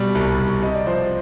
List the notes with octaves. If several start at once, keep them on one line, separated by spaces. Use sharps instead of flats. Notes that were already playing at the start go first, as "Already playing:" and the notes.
Already playing: B2 G3 D5
C2
C2
C3 D#5
D5
F3 C5